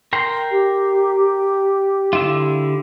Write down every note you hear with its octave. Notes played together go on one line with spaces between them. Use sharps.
A#4 G5 C6
G4
D3 E4 F4